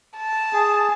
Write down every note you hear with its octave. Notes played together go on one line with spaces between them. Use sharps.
A5
G#4